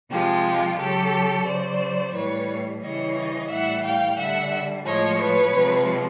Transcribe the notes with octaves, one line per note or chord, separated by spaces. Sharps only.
C3 F3 G#3 F4 G4
C#3 F#3 G4 A4
C#3 F#3 C5 D5
A2 E3 G3 B4 C#5
C#3 E3 G3 C#5 D#5
A2 E3 G3 E5 F#5
F5 G5
D3 G3 E5 F#5
A2 F3 G#3 C#5 D#5
B4 C#5
C3 F3 G#3